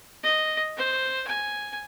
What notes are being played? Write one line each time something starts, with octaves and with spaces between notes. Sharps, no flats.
D#5
C5
G#5